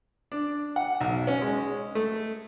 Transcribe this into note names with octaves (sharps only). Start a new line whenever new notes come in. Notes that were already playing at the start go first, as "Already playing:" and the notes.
D4
F#5
B1
C#4
G#3
A3